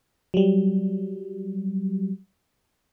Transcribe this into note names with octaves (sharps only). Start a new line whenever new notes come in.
F#3 G3